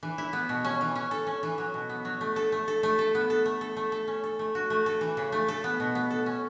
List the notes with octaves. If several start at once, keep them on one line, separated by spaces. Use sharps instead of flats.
E3
E4
B3
B2
C#4
E3
C#4
A4
C#4
E3
F#3
B2
B3
F#3
A3
A4
A3
A4
A3
A4
B3
A4
A3
A4
A3
A4
C#4
A4
A3
F#4
A3
A4
E3
C#3
A3
A4
B3
B2
B3
A4
C#4